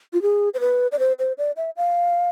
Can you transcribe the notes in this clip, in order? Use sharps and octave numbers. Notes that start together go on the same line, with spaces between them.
F4
G#4
C5
B4
D5
C5
C5
D5
E5
F5